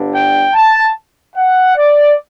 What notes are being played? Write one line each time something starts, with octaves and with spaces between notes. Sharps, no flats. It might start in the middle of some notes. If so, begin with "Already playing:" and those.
Already playing: G1 G2 D3
G5
A5
F#5
D5